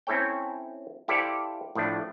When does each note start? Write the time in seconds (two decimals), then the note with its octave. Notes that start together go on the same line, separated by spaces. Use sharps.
0.07 C4 C#4 E4 A4 C#5 G5
1.08 E4 G4 A4 C5 D5 F5
1.75 A2 F3 A3 D4